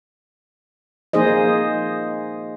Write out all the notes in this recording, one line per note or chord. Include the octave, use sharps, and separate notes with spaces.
F3 A#3 D#4 G#4 C5 D#5